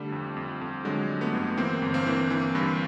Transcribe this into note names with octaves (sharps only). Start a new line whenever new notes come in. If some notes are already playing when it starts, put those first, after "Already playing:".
Already playing: D3 G3 A3
F2
F2
F2
D3 F#3 G#3
D3
A3 B3
G1
E3 A#3 C4
G1
A#3 C4
E3
E3
G2